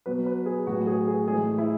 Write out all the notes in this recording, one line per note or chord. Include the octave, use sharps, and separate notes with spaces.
B2 F#3 B4
B4
G#4
A2 F#3 F#4
G#4
G#4
A2 E3 G#3 G#4
E4